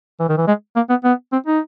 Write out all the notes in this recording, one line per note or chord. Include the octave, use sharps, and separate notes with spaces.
E3
D#3
E3
G#3
A#3
B3
B3
C4
D#4